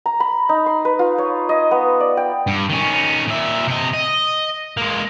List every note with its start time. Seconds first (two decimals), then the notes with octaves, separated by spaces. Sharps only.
0.06 A#5
0.20 B5
0.49 D#4
0.66 C6
0.85 B4
0.99 F4
1.18 C#5
1.49 D#5
1.71 B3
2.00 D5
2.17 G5
2.47 G2
2.69 D#3 C#4
3.28 A#2 E5
3.68 C3 D#5
3.94 D#5
4.77 G#3 A#3